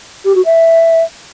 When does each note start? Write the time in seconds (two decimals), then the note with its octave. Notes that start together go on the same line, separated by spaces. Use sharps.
0.25 G4
0.35 F#4
0.45 E5